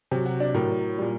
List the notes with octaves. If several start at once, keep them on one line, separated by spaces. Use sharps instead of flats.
C3 F#3
F#4
D4
A2 F#3 A#4
A#2 G3